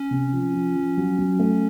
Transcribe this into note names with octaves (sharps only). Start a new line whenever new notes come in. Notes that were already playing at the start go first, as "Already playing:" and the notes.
Already playing: C#4
C3
F3
F3
F3
F#3
F#3
A3